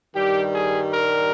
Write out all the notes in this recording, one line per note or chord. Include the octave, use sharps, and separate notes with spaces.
G2 D#3 G3 G4
G#4
A#4